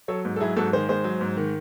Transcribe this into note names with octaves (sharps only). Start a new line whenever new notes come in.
F#3 A4 C#5
G#2
A4
F#3 E4 G#4
G#2 F#4 A4
D#3 G#4 C5
G#2 G#4 C5
F#3
G#2
D#3